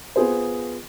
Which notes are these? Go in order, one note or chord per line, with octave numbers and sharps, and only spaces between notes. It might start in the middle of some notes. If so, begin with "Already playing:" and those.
B3 F4 G#4 C5